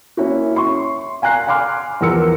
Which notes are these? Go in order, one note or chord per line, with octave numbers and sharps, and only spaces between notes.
A#3 C#4 E4 F#4
E5 C6 C#6
F5 G#5 A#5 F#6 C7
F5 G#5 C6 D6 F6
E2 F3 A#4 E6 C#7